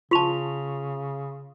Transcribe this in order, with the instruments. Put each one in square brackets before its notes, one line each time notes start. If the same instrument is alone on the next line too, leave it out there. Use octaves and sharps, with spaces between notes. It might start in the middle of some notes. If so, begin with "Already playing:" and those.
[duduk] C#3 [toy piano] F4 A5 [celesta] C6 C#6 F7